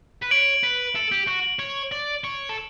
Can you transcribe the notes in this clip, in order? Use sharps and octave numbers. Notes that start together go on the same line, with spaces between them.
B4
C#5 D7 F#7
B4
A4
G4
F#4
C#5
D5
C#5
A4